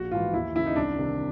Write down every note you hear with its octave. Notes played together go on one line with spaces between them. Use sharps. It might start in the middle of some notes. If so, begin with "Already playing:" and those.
Already playing: A#1 F#4
G#2 E3 F4
D#2 E4
C#3 E3 E4
D#4
C2 D4
C3 D#3